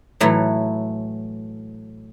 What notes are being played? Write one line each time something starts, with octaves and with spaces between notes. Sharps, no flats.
A2 E3 F#3 A3